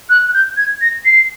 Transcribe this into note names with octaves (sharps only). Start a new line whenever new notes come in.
F#6
F#6
G6
G#6
A#6
C7